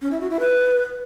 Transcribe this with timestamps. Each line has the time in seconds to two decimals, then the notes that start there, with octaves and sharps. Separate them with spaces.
0.02 C#4
0.11 E4
0.21 F#4
0.30 E4
0.40 B4